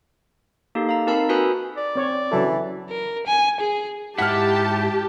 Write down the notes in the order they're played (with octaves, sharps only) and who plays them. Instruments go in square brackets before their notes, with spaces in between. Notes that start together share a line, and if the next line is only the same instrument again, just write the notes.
[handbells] A#3 D#4 G4 A4
F5 A#5
C4 D#4 A#4 A5 B5 E6
F#4 A4 B4 G#5 B5 D#6
[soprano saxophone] D5
[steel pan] C4 C#5
[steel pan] C#3 F#3 A4 [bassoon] E3
[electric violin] A#4
G#5
G#4
[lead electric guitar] G#2 E4 [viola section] G4 [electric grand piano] F#5 F6 [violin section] A5